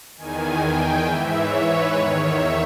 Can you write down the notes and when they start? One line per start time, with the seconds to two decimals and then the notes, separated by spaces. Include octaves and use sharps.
0.18 E2 D#3 G#5
0.62 G5
1.06 G#2 E3 E5
1.36 C#5
1.66 B4
1.95 E2 D#3 C#5
2.25 E5